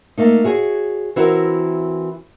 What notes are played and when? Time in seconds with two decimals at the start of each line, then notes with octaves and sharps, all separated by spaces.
0.17 A3 A#3 D#4
0.44 F#4 G#4 C#5
1.16 E3 C4 E4 F#4 A#4